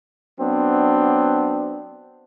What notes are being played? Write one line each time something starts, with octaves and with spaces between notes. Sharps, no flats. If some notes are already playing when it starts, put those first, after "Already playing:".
F#3 B3 C4 D4